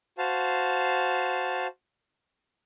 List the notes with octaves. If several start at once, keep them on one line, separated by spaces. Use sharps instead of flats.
F#4 C5 F5 A5